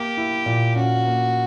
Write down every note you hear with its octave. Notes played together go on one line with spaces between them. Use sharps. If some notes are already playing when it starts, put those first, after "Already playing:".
Already playing: A#3 G4
E4
A#2
C#4 F#4
A#3